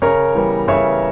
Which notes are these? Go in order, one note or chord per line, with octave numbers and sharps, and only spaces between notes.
C#3 A#4 C#5
E3 G3 B3
C#3 C#5 E5